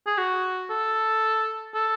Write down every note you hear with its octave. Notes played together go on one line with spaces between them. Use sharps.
G#4
F#4
A4
A4